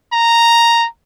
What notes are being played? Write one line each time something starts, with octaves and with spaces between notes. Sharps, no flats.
A#5